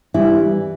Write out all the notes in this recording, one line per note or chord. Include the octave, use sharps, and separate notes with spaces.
E3 G3 E4